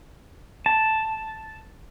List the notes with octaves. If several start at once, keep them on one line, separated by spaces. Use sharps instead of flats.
A5